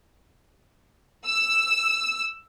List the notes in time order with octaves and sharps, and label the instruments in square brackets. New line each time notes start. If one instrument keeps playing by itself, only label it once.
[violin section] E6